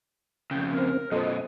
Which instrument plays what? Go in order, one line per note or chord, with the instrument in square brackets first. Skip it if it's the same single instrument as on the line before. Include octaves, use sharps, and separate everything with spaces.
[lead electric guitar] F2 C#3 [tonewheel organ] G5
[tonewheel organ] C4 [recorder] A#4
[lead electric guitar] F#2 B2 [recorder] F4 [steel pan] A4 C5 [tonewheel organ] D#5